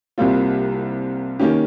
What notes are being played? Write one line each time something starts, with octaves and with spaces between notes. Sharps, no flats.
C2 C3 G3 A#3 F4
D#3 A#3 C#4 G4